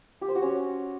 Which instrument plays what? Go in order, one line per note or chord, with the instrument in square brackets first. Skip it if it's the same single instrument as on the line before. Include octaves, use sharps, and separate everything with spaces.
[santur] G4
C5
F#4
C#4